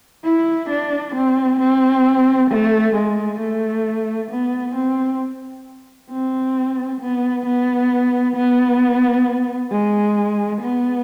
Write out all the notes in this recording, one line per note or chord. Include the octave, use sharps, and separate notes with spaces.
E4
D4
C4
C4
A3
G#3
A3
B3
C4
C4
B3
B3
B3
G#3
B3